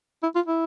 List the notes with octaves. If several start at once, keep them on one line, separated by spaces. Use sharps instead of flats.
E4
F4
E4